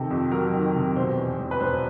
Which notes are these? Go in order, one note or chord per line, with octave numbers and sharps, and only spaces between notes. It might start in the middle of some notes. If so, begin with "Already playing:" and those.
Already playing: C3 D#3 A4
F2
F#3 A#4
D#3
C3
B2 C5
E2
E1
B4
E1 C5